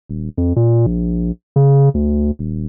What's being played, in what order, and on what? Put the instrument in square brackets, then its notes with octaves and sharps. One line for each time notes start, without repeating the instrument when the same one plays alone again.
[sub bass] D#1
F2
A#2
A#1
C#3
D2
D#1